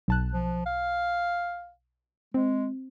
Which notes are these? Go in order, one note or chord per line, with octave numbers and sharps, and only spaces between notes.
B1 A5 F#6
F3
F5
G#3 C4